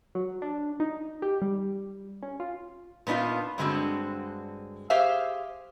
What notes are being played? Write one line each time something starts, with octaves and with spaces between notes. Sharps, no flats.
F#3
D4
D#4
G4
G3
C#4
F4
A#2 B3 D4 D#4 F4
G2 D3 G#3 C4 F#4
G4 G#4 C5 E5 F5